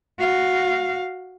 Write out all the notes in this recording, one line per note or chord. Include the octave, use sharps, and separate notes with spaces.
F#4 F5